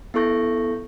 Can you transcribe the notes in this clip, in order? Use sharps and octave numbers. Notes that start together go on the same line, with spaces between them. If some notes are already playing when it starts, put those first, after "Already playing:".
B3 E4 A4 C#6 G6 A#6